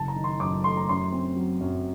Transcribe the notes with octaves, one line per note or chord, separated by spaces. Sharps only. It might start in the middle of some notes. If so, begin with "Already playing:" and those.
Already playing: F#1 A5
A#5
D#3
C6
F#2 D6
A3 C6
A#5
F#2 C6
C4
F#3
F#2